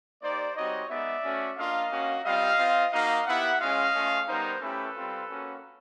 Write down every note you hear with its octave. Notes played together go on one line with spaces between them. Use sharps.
A#3 D#4 G4 C5 D5
G3 C4 D#4 F#4 C#5 D#5
G#3 B3 D#4 D5 E5
A3 C#4 F#4
A#3 D4 F4 D#5 F5
A#3 C#4 F#4
G3 C4 F4 D#5 F5
C4 F4
A#3 D#4 F#4 D#5 F5
B3 E4 G4 E5 F#5
G#3 C#4 F4 D#5 F5
A3 C#4 F4
G3 B3 D#4 A#4 C5
A3 C#4 E4 G4 A4 B4
G3 C4 F4
A#3 C#4 F#4